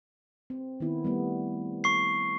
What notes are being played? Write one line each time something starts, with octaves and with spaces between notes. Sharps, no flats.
C4
D#3 B3 E4
G3 A3 B3
C#6 C7